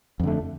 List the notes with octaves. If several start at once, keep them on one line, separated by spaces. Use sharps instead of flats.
F2 D3 A3